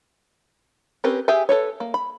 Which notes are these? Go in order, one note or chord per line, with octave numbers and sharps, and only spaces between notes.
C4 C#4 G4 A#4 B4
G4 G#4 E5 G5 G#5
A4 B4 C#5
A#3
B5